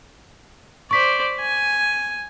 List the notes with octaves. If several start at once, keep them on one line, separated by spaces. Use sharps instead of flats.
C5 D5 C#6 B6
G#5